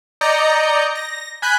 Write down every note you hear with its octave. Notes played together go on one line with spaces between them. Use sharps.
D5 D#5 A#5 G6 C#7
A#6
G#5 B5 F#6 G6